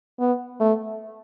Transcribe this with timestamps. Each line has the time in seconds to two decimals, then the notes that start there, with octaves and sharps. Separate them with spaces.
0.20 B3
0.60 A3